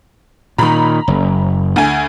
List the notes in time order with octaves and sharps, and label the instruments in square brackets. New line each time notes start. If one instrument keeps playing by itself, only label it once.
[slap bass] A#2 D#3 [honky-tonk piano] A#5 B5
[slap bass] F#1
[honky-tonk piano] D2 G#5